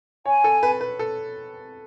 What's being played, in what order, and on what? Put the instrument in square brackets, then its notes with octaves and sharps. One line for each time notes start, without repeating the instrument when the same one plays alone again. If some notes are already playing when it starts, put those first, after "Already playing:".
[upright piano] C#5 [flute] G#5
[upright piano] A4
B4
B4
A4